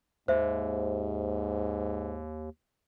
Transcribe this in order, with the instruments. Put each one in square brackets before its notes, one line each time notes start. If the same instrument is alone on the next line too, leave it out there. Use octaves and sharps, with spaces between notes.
[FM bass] D#2 [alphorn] G#2 [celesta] C5 E5